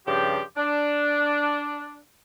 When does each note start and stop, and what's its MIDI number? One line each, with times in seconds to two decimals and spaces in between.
0.07 0.41 43
0.07 0.41 49
0.07 0.41 53
0.07 0.41 67
0.57 2.00 62